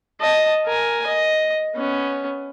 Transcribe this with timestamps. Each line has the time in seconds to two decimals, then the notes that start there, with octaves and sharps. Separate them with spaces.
0.20 D#5 A5
0.66 A#4 G#5
1.06 D#5
1.75 B3 C#4